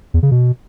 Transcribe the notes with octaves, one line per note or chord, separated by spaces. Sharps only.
E2
C#3
B2